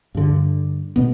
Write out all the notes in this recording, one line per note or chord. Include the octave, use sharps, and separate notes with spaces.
G2 D3
B2 B3